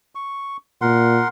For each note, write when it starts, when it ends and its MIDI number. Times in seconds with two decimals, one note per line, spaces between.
0.15 0.57 85
0.81 1.21 46
0.81 1.28 70
0.81 1.28 78
0.81 1.28 84